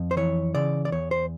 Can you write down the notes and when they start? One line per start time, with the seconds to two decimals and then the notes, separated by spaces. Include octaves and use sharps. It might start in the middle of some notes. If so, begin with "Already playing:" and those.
Already playing: F2
0.11 C5
0.17 E3 C#5
0.55 C#3 D5
0.85 D5
0.92 E2 C#5
1.11 C5